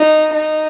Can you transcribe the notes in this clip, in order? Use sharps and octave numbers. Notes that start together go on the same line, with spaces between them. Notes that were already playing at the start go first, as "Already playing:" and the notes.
Already playing: D#4
D#4